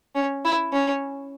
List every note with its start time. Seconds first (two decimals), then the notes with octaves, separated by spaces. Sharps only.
0.15 C#4
0.45 E4
0.73 C#4